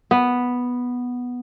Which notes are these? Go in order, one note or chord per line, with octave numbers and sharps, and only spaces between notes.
B3